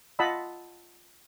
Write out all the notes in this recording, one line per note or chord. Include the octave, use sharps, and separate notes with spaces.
F4 D#5 F#5 A5 B5 E6